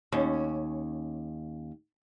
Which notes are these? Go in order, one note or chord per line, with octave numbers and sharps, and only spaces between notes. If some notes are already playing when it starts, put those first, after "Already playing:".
D#2 C#4